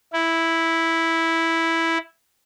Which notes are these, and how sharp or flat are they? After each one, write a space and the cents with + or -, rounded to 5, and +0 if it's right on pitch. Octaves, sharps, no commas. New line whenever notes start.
E4 -5